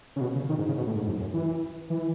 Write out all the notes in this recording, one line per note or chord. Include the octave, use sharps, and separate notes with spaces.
C#3
B2
C#3
D#3
G#2
C#3
B2
A2
G#2
F#2
F#2
E3
E3